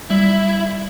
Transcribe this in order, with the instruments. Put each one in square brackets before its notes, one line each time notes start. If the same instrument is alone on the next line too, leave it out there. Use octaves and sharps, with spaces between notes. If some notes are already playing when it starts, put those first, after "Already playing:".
[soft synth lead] G3 [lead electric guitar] E4